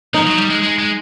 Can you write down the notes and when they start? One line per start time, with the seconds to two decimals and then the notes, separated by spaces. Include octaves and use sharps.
0.14 F3 D#4
0.27 F#3
0.38 G3
0.50 G#3
0.62 G#3
0.79 G#3